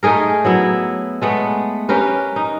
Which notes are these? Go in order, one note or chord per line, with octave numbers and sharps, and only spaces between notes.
A3 D#4 G#4 A#4
F#3 B3 E4
G#3 A3 B3
C#4 G4 A#4 B4
D#4